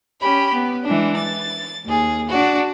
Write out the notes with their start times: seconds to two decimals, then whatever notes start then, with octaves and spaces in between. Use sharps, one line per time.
0.21 C#4 G4 B5
0.53 B3
0.85 E3 G#3 D4
1.17 A6
1.86 D#2 G#4
2.28 D4 F#4